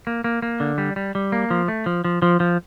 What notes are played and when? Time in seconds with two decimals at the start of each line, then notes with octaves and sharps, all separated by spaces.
0.07 A#3
0.24 A#3
0.42 A#3
0.60 D3
0.78 G3
0.96 G3
1.15 G3
1.32 A#3
1.51 F3
1.68 A3
1.86 F3
2.05 F3
2.22 F3
2.40 F3